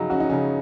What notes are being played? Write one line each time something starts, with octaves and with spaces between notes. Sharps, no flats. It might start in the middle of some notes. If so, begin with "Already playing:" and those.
Already playing: C#3 F#3 D#4
C#4 F#4
D#4
C#3 C#4